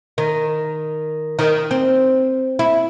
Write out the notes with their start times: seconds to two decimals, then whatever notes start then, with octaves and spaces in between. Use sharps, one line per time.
0.18 D#3
1.39 D#3
1.71 C4
2.59 E4